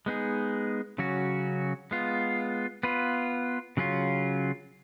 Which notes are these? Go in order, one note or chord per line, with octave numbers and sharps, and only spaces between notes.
G#3 B3 D#4 G#4
C#3 F#3 C#4 F#4
G#3 B3 F4
B3 F4 B4
C#3 F#3 C#4 F4